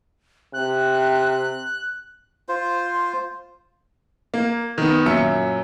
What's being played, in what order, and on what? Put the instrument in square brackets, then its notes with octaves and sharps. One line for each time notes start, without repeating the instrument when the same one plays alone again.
[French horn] C3 [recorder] F#6
[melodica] F4 C5
[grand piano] A#3
D#3 B3
F#2 A#2 E5 E6 C#7